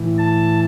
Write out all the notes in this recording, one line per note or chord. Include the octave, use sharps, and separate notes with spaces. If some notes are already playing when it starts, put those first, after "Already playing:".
Already playing: A2 E3
A5